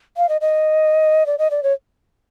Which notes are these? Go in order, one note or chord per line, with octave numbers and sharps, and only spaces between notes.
F5
D#5
D#5
D5
D#5
D5
C#5